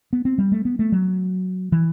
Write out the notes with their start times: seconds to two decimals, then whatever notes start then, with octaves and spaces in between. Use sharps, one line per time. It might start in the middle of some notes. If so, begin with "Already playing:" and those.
0.13 B3
0.25 C4
0.38 G3
0.52 A3
0.65 B3
0.79 A3
0.92 F#3
1.72 E3